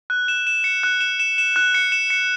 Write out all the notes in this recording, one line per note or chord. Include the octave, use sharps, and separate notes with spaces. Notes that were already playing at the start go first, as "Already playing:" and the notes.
F#6
E7
E7
C#7
F#6
E7
E7
E7
F#6
C#7
E7
C#7